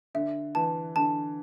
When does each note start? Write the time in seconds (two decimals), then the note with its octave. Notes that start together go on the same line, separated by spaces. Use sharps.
0.15 D3 E5
0.55 E3 A5
0.96 D3 A5